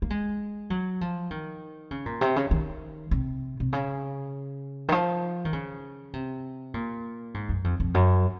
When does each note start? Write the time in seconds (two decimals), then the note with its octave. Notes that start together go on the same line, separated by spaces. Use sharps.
0.02 A#3
0.10 G#3
0.70 F#3
1.01 F3
1.31 D#3
1.91 C#3
2.06 A#2
2.21 C3
2.36 C#3
2.51 D#3
3.11 C3
3.60 C3
3.73 C#3
4.88 D#3
4.92 F3
5.45 D#3
5.53 C#3
6.13 C3
6.74 A#2
7.34 G#2
7.49 F#2
7.64 F2
7.80 F2
7.94 F#2